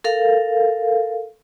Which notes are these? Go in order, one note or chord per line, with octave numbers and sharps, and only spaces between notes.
A4 A#4 F5